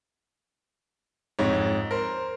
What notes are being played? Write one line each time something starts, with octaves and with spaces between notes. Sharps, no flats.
F2 G#2 D#4 C#5
A#4 C5